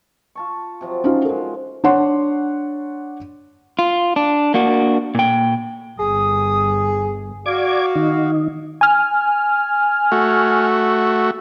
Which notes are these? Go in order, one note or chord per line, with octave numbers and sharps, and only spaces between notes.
F4 A5 C#6
C3 F3 F#3
C#4 D#4 F4
G#3 A#4 C6
D4 C#5 F#5 C6
F4
D4
A#3 D4 F#4
A#2 G5
G1 G#4 D#6
F#4 D5 F5 D6 G#6
D#3 D#4
G#5 F6
A3 F#4